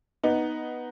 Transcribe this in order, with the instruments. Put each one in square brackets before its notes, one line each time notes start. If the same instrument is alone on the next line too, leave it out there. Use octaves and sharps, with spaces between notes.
[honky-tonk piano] B3 D#4